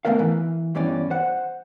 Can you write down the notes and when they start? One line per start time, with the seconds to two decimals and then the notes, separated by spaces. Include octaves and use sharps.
0.05 G#2 C#3 A3 B3 A#4 F5
0.19 E3
0.75 E2 G2 E3 C#4 D5
1.10 C5 F#5